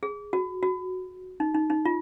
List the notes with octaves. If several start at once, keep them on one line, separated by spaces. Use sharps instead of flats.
G#4
F#4
F#4
D#4
D#4
D#4
F4